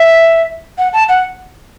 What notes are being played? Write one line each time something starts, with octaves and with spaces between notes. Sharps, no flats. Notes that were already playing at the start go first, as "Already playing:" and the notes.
Already playing: E5
F#5
A5
F#5